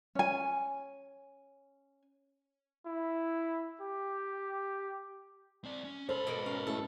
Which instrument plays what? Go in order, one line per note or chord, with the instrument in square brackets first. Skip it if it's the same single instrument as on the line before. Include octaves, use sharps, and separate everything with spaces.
[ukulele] C#4 G#5
[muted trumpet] E4
G4
[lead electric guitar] C4 D5
C#4
[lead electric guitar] G#2 B5 [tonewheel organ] A4 [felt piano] C5 [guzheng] F5
[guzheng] B2 A#3
[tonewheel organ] C#4 A#4 [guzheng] F5
[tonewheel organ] A3 C#4 E4 [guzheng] A4